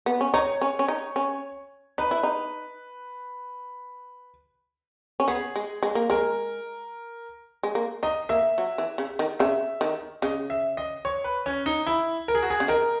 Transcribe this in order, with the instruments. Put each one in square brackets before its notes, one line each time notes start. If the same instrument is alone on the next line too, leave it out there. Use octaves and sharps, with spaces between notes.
[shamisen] B3
C#4
[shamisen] D#4 [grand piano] C#5
[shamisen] C#4
C#4
D#4
C#4
[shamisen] D#4 [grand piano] B4
[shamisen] E4
D#4
C#4
[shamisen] B3 [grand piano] G#4
[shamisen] G#3
G#3
A#3
[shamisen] G#3 [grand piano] A#4
[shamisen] G#3
A#3
[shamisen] D#4 [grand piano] D#5
[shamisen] A#3 [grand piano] E5
[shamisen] F#3
E3
C#3
D#3
[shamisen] C#3 [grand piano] E5
[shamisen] D#3
[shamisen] C#3 [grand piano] D#5
[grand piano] E5
D#5
C#5
B4
C#4
D#4
E4
A#4
G#4
F#4
G#4
[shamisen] C#3
[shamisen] D#3 [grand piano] A#4